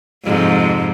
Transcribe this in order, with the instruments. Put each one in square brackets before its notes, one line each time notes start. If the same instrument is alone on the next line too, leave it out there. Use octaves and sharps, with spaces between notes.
[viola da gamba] F2 G#2 C3